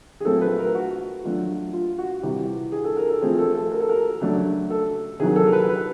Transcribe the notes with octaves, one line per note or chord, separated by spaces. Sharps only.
G#4
A#2 F#3 A3 C4 F4 A4
B4
A#4
F#4
F#3 A3 D4 F4
F4
F#4
C3 E3 G3 G4
G#4
A4
A#4
A4
F3 A3 C4 G#4
A4
A4
A#4
A4
A#4
C#3 F#3 A3 D4
A4
C3 D#3 F#3 G#4
A4
A#4
B4
B4